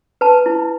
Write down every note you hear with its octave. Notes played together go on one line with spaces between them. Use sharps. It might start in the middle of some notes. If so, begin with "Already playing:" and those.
B4 A5
E4